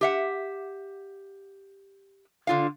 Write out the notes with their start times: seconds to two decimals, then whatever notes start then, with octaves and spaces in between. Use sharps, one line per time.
0.01 G4 E5 F#5
2.47 D3 F4 F5